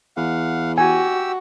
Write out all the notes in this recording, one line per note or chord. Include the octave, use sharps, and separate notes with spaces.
E2 F5 F#5
F#4 G4 G#5 E6